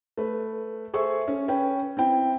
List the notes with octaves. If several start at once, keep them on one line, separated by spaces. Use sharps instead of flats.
A3 B4
G#4 A4 C5 E5 C#6
C#4
C#4 B4 G5
C4 E4 G5